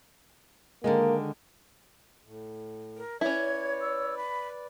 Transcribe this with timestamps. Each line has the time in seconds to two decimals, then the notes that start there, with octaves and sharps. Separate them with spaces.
0.84 D3 D#3 G#3 A#3
2.25 A2
2.97 A#4
3.21 C#4 E4 B4 C#5 D5 G#6
3.81 E6
4.17 B5